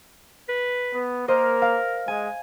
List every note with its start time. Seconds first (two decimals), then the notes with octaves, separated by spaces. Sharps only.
0.49 B4
0.94 B3
1.28 A#3 A#4 C5 D#5
1.62 F5
2.08 G#3 G#5